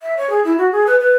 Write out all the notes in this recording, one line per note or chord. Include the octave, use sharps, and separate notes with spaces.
E5
C#5
G#4
E4
F#4
G#4
B4
B4